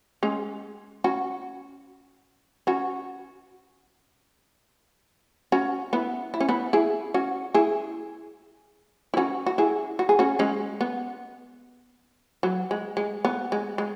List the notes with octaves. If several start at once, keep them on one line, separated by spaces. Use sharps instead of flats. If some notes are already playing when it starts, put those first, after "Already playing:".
G#3 C#4
C#4 F#4
C#4 F#4
C#4 F#4
B3 E4
E4
C#4
B3 E4
E4 G#4
C#4 F#4
E4 G#4
E4
C#4 F#4
F#4
E4 G#4
F#4
G#4
C#4 F#4
G#3 C#4
B3
F#3
G#3
G#3
B3
G#3
G#3